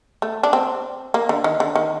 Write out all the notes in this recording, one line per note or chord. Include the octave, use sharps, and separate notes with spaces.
A3
D4
C4
A#3
D3
D#3
D3
D#3